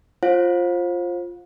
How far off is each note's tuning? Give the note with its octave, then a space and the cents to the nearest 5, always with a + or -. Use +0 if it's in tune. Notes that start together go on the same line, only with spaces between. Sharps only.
F4 +0 C5 +25 F5 +40